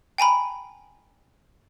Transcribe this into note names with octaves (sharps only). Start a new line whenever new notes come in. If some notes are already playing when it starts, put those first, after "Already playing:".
G5 G#5 A#5 B5